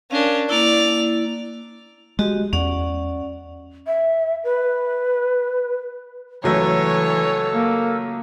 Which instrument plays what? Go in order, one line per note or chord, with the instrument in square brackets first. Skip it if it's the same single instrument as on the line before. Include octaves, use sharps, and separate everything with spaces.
[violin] C#4 D4 [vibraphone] A#4 F5
[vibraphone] A#3 E4 [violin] D5 F7
[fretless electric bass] G#3 [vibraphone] F#4 G4 D#5
[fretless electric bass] E2 [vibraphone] C#4 D5 F#5
[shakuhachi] E5
B4
[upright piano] C#2 F#3 A3 [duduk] E3 [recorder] A4 [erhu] C#5
[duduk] A#3